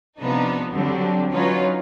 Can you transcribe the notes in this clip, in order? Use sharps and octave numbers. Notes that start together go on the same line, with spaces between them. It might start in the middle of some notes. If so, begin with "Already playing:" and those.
C3 F3 B3 D4 D#4
D3 F#3 G3 C4 D4
F#3 C#4 D#4 F4 B4